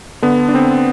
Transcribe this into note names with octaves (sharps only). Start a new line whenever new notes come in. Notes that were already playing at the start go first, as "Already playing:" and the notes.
D3 B3
D4
D3 C4